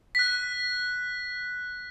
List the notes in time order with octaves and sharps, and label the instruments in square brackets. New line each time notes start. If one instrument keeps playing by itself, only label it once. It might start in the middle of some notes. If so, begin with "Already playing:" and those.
[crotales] F#6 B6